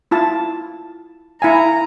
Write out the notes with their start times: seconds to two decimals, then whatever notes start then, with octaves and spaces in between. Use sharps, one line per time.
0.11 E4 F4 A5
1.42 E4 F5 G#5 A#5